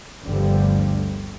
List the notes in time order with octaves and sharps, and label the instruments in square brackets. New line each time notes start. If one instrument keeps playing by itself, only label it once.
[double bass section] G1 D2 D3 F3 G3